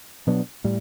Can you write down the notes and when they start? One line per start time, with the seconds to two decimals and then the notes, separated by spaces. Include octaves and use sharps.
0.27 B2 F#3 B3 D4
0.64 A2 G3